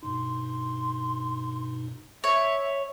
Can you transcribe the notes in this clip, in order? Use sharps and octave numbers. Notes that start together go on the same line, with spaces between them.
G2 B2 D#4 C6
C#5 E5